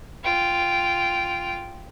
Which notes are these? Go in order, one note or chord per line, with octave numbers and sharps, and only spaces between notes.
F4 G5